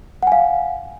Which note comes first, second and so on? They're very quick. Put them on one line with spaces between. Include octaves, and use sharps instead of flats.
F#5 G#5 F5